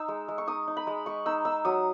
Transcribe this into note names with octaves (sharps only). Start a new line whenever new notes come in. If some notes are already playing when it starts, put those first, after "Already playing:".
Already playing: D#4 E6
G#3
G#3
C#6
D#4 D#6
D#4
B5
G#3
G#3 C#6
D#4 E6
D#4 E6
F#3 D#6